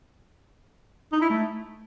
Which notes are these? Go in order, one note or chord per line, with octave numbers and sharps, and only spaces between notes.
D#4
E4
A3